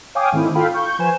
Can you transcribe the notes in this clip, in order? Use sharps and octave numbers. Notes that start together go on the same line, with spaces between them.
C#5 F5 G5 G#5 D6 D#6
G#2 D#3 A3 C4 E4
F4 A4 F5 G5 B5
C#6 G6
F3 B4 C5 G#5 E7